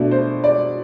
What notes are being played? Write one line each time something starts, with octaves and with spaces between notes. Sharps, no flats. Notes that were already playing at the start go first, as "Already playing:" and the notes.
Already playing: B2 A3 D4
C5
D5